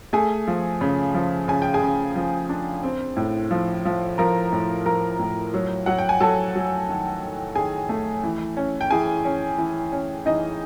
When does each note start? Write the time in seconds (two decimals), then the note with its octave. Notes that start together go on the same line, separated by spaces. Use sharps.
0.13 A3 G#4 G#5
0.48 F3
0.81 C#3
1.14 F3
1.48 C#3 G#5
1.62 G5
1.74 G#4 G#5
1.82 C#3
2.16 F3
2.49 D4
2.83 C4
3.17 A2
3.51 F3
3.85 F3
4.18 F3 A#4 A#5
4.53 A2
4.86 F3 A#4 A#5
5.19 A2
5.54 F#3
5.86 F#3 F#5
5.98 G5
6.09 G#5
6.20 F#3 A4 A5
6.55 F#3
6.89 D#3
7.23 D#3
7.55 D#3 G#4 G#5
7.89 A3
8.24 E3
8.57 C#4
8.81 G5
8.91 E3 G#4 G#5
9.25 C#4
9.58 E3
9.92 C#4
10.26 E3 D#4 D#5